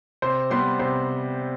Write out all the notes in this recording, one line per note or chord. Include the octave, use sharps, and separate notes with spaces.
C3 C5 C6
G3 B3 C5 C6
C3 C5 C6